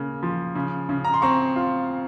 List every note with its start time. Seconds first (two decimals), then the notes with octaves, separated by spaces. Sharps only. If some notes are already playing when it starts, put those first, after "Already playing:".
Already playing: C#3 A#3
0.23 F3
0.55 C#3
0.89 C#3
1.04 A#5
1.14 C6
1.22 C4 A#5 C#6
1.56 F4